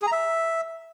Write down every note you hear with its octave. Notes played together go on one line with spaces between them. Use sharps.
G#4
A#5
E5